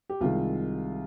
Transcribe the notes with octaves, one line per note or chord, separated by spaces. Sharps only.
G4
C2 C3 D#3 G#3 F4